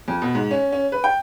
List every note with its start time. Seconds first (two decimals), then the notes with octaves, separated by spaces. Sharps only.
0.08 F2
0.22 B2
0.35 G#2
0.51 C#4
0.72 C#4
0.92 B4
1.04 G5